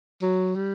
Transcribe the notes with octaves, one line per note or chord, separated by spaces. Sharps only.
F#3
G3